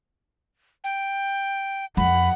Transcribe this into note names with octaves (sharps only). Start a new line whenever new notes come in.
G5
F2 F#5 B5